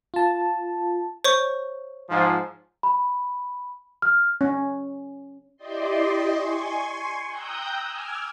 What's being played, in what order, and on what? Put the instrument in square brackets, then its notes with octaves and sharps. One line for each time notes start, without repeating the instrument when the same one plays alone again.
[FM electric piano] F4 A5
[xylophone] C5 C#5 C#6
[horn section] G#2 F3
[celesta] B5
F6
[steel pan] C#4
[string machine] E4 G4 D5 D#5 C6
G#5 C6 C#6
G5 A#5 D#6 E6 F#6 G6
G#5 D6 E6 F6 G#6